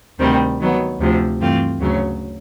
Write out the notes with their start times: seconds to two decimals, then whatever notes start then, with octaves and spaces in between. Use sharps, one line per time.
0.19 D2 C3 D#3 G3 C4
0.60 D#3 F#3 B3
1.00 D2 C3 F3
1.40 G2 E3 A3 C4 F4
1.80 D2 C#3 F#3